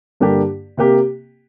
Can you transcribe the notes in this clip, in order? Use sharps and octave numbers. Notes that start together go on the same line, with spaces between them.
G2 D3 A#3 D4 G4
C3 A#3 G4